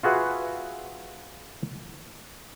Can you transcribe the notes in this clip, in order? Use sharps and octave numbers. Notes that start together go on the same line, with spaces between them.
F4 F#4 G#4 B4 E5 F#5